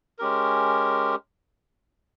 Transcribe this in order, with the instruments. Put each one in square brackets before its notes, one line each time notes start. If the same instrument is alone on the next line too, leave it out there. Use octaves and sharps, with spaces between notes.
[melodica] G#3 C#4 G4 A#4